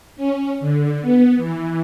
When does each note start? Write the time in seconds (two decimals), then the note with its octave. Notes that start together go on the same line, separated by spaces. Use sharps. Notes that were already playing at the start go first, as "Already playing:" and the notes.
0.16 C#4
0.60 D3
1.02 B3
1.37 E3